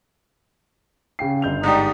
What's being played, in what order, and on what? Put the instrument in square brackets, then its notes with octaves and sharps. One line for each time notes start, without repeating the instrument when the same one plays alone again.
[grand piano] C#3 G5 C7
G1 G6 F7
[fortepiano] G#2 D4 G4 [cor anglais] D#4